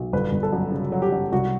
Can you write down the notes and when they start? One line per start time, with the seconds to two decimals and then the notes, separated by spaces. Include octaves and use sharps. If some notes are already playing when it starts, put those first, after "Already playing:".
Already playing: B1
0.13 G1 B4
0.32 G1
0.43 A4
0.53 F#2
0.72 C#3
0.92 F#3
1.02 G4
1.12 F#2
1.32 C2 F#4